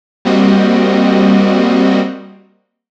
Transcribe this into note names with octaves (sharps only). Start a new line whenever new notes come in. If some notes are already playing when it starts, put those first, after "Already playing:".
G3 A#3 C4 F#4 D#5